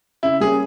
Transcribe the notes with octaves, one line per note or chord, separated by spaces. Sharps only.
C#3 E4
G3 A#3 C#4 G#4